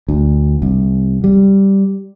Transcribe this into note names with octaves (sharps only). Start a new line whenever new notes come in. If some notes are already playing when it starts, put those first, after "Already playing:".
D2
C2
G3